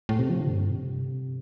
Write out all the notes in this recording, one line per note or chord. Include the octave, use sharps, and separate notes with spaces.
A2
C3
F3
D3
G2
C3